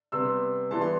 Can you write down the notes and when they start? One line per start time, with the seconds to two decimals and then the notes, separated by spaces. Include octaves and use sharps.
0.12 C3 G3 B3 C6 E6
0.71 E3 G3 B3 A5 C6
0.81 C6